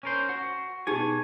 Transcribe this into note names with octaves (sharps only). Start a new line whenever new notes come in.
C#4 A#4 C5
F#4
B2 D#4 G4 G#4 G#5